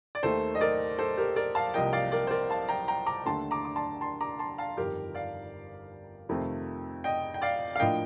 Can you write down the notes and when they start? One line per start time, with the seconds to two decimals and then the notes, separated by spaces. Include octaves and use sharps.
0.15 D5
0.23 D#2 D#3 A3 A4 C5
0.55 D#5
0.61 A#4 D5
0.99 A4 C5
1.17 G4 A#4
1.36 A#4 D5
1.55 F5 A5
1.74 C2 C3 F3 A#3 D#5 G5
1.93 D5 F5
2.12 A#4 D5
2.27 C5
2.31 A#4 D5
2.50 F5 A5
2.68 G5 A#5
2.88 G5 A#5
3.06 A#5 D6
3.25 D#2 D3 A3 A5 C6
3.51 A#5 D6
3.65 D6
3.76 A5 C6
4.01 A5 C6
4.21 A#5 D6
4.39 A5 C6
4.58 F5 A5
4.77 G1 F2 D#3 G4 A#4
5.15 D5 F5
6.29 F2 C3 D#3 A3 C4
7.04 D#5 G5
7.34 G5
7.42 D5 F5
7.76 F5
7.79 A2 F3 A#3 D4 D#5 G5